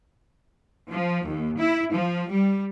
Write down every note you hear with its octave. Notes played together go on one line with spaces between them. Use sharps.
F3
D#2
E4
F3
G3